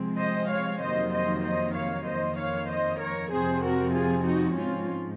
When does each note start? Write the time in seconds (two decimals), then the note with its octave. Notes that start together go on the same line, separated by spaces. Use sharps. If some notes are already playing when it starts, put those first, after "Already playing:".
Already playing: C3 F3 G#3 C4
0.18 C5 D#5
0.50 C#5 F5
0.81 F2 C3 D#3 F#3 A#3 C5 D#5
1.12 C5 D#5
1.43 C5 D#5
1.74 C#5 F5
2.05 F2 D#3 A#3 C5 D#5
2.37 C#5 F5
2.68 C5 D#5
2.99 A#4 C#5
3.31 F2 C3 F3 C4 G#4 C5
3.62 F#4 A#4
3.93 F4 G#4
4.24 D#4 F#4
4.55 G#2 F3 G#3 C4 C#4 F4